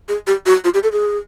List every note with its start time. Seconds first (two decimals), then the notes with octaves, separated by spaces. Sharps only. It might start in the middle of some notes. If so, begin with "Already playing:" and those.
0.09 G#4
0.27 G4
0.46 F#4
0.64 F4
0.74 G4
0.83 A4
0.92 G#4